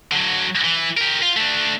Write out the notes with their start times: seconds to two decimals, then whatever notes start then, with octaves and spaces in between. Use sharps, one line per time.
0.12 D3 F#3
0.64 E3
0.97 G4 A#4
1.22 F4
1.37 A3 D4